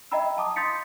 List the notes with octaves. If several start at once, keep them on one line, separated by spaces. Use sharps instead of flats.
D#5 E5 G5 A#5 B5 E6
F5 A5 D6 D#6
C6 D#6 G6 A6 B6 C#7